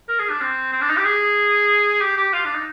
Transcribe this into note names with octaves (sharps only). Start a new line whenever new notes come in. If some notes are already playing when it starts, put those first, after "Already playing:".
A#4
G#4
D4
C4
C4
D4
D#4
G4
G#4
G4
G4
F4
D4
D#4